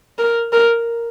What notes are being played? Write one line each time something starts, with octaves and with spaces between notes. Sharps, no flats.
A#4
A#4